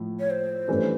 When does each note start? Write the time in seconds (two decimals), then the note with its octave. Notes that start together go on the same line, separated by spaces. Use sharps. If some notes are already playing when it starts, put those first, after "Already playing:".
Already playing: A2 F3
0.20 C#5
0.30 C5
0.68 G2 E3 A3 C#4